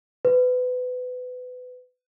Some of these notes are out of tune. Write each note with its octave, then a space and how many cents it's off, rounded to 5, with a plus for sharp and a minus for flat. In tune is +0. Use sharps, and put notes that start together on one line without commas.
B4 +25